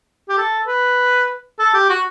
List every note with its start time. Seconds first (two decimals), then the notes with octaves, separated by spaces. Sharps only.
0.30 G4
0.38 A4
0.67 B4
1.59 A4
1.74 G4
1.89 F#4